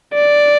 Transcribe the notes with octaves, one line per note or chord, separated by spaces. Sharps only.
D5